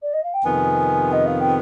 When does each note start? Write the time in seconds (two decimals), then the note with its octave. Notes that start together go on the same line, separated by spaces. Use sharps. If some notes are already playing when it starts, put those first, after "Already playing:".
0.02 D5
0.13 D#5
0.23 F5
0.33 G5
0.44 F2 C3 D#3 B3 G#5
1.12 D#5
1.26 F5
1.39 G5